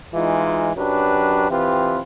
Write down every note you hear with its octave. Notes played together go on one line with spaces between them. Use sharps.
E3 G#3 D#4 F4
F#2 F#3 D4 G4 B4
E3 C4 F4 G4 B4